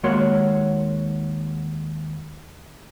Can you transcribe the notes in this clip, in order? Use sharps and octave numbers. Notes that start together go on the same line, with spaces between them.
D#2 G#3 A#3 F#4 C#5 C6